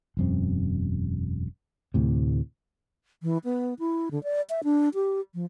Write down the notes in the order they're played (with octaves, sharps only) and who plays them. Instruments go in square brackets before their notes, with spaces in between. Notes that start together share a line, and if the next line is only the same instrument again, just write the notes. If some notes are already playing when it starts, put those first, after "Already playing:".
[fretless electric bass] E1 F#2 C4
D2 A2 C3
[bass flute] E3
B3
E4
D3
D5
E5
D4
G4
F3